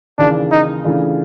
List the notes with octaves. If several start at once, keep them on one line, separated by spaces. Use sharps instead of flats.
D#2 C#3 E3 D4
D#4
C#3 E3 A3 D4 F4